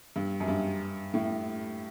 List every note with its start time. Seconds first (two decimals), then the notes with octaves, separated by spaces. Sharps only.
0.16 G2
0.40 F#2
0.48 G2
1.14 A2